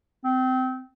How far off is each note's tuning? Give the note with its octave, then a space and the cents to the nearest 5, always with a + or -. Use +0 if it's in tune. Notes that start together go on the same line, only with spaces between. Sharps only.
C4 -25